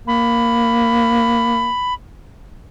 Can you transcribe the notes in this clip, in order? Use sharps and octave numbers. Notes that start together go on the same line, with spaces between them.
A#3 B5